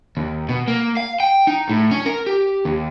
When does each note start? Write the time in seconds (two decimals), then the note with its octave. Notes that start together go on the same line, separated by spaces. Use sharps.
0.17 D#2
0.49 B2
0.68 A#3
0.97 F5
1.20 G5
1.47 D#4
1.69 A2
1.91 C#4
2.06 A#4
2.27 G4
2.65 D#2